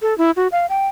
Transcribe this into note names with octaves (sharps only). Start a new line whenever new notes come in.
A4
E4
F#4
F5
G5